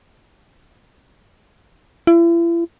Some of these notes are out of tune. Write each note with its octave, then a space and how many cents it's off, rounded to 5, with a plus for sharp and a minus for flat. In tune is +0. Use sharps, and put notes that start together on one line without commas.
E4 +40